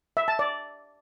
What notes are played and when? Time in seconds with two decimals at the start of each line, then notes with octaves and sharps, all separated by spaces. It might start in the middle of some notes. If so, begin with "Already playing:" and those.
0.17 E5
0.28 A5
0.39 D5